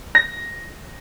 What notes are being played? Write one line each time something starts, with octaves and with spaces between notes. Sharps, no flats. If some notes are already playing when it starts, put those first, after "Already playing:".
A#6